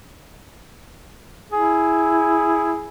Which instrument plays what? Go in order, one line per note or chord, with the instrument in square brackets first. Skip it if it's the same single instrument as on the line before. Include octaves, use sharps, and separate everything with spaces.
[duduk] E4 [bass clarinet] G#4